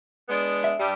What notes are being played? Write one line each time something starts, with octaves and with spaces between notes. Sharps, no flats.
G#3 B3 D4
E5
G2 G3